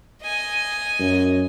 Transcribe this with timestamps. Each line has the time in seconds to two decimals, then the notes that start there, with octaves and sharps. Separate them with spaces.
0.22 D#5 G#5
0.99 F#2